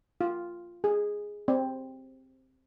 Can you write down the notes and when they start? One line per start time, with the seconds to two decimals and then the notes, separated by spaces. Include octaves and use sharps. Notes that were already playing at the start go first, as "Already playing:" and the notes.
0.21 F4
0.84 G#4
1.48 C4